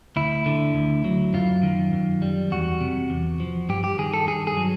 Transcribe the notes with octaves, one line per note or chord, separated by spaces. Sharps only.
D2 E4
D3
D2
F#3
F#2 F4
D#3
F#2
G3
E2 F#4
C3
E2
F3
G2 G4
G4
D#3 G#4
A4
G2 G#4
G#4
F#3